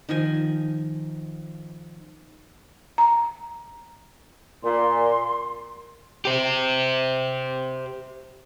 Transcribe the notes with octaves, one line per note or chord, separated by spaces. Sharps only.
D#3 F3 G#5
A#5
A#2 C6
G4 C5